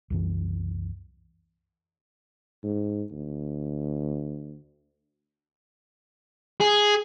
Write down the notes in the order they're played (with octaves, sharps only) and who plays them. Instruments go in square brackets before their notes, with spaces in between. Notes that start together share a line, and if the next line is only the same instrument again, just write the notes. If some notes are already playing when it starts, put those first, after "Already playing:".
[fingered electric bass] C2 F#2 E3
[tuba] G#2
D2
[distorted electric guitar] G#4